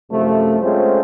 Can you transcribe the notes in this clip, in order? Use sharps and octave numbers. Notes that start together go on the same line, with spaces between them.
F#2 C3 F3 A3
G#3 A3 C4 C#4 F4 C5